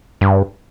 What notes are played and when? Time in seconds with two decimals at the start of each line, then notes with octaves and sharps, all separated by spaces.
0.21 G2